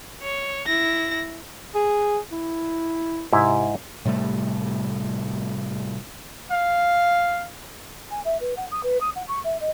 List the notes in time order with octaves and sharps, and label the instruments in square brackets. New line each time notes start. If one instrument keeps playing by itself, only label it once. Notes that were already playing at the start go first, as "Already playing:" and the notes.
[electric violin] C#5
E4 A#6
[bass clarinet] G#4
E4
[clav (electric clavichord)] G#2 E4 [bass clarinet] C3
[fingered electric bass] A2 C3 G3 A3
[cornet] F5
[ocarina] G#5
E5
B4
F#5
D#6
B4
D#6
F#5
C#6
E5
D#5